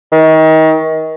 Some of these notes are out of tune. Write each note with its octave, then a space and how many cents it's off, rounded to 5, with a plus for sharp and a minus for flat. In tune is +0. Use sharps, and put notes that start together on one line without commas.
D#3 +30